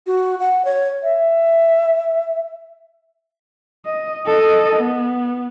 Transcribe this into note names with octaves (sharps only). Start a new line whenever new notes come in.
F#4
F#5
C#5
E5
D#5
A4 D#5
B3